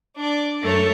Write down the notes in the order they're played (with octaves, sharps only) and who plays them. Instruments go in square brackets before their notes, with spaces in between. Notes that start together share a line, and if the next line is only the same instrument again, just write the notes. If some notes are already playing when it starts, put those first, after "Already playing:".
[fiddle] D4 D5
[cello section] F#2 A3 A4 [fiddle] A#4 C#5